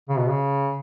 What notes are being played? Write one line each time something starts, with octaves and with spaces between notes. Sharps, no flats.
C#3
B2
C#3